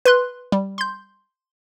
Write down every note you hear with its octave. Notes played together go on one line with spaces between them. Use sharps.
B4 C6 F#6
G3
C6 G6